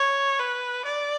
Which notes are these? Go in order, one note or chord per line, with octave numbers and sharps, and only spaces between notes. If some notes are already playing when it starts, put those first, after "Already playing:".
Already playing: C#5
B4
D5